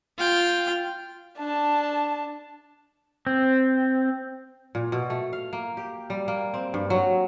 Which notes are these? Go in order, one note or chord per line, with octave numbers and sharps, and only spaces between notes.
F4 G5
D4 A5
C4
A#2
B2
A3
F5
A#3
G4
G3
A#3
C4
G2
F#3